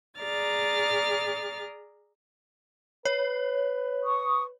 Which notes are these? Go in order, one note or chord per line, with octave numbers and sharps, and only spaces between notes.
G#4 D5 A#5 F6 A6
B4 C#5
C#6 D#6